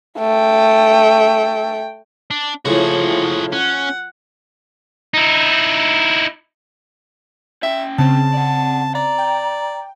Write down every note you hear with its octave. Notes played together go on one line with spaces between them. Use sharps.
A3 G5
D4
A2 C#3 F3 E4 F#4 G#4
C#4 F#5
D#4 E4
C#4 E5 G5
C#3 C4 A5
D5 F#5
D5 A#5
G5